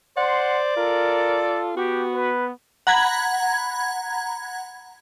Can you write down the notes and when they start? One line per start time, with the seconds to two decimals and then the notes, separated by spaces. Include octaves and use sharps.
0.17 C5 D5 F#5 C6
0.77 F4 A4 A#4
1.77 B3 F#4 G4
2.13 B4
2.87 F#5 A#5 B5 G#6